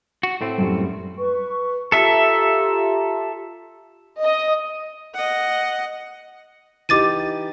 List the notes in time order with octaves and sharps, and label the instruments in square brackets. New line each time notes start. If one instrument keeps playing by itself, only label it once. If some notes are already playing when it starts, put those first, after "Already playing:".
[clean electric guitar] F#4
A2 A3 C4
[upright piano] F#2 G3
[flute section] B4 C#6
[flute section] F4 G4 A#5 [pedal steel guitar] A4 E5
[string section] D#5
[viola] D#5 F#5
[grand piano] E3 D#4 G4 [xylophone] D6 A6 D#7